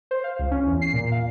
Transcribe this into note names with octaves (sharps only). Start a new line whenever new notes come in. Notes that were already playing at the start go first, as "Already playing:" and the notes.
C5
F5
C#2
C#4
E2
C7
A#2
F5